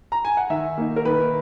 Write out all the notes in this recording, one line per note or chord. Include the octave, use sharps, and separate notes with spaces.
A#5
G#5
F#5
D#3 E5
A#3 D#4
A#4
D#3 B4